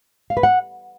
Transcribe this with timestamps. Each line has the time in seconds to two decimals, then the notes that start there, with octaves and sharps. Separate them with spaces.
0.30 F5
0.37 B4
0.43 F#5